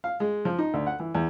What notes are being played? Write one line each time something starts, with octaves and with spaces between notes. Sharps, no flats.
F5
G#3
F3
D#4
D2
F#5
E3
E2